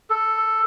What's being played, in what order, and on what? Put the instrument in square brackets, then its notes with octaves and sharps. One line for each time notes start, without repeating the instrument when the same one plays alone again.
[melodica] A4